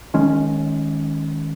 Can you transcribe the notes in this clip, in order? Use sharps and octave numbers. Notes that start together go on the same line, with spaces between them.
D#3 G#3 C#4